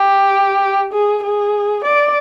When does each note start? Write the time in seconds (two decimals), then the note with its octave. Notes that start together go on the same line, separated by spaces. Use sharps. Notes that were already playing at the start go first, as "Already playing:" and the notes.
Already playing: G4
0.93 G#4
1.23 G#4
1.84 D5